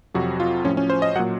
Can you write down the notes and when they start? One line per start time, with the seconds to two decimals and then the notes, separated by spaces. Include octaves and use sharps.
0.14 F2 C3 F#3 F#4
0.40 F4
0.65 A2 F3 C#4
0.77 C#4
0.90 C5
1.02 D#5
1.16 F#3 F#5
1.19 A#2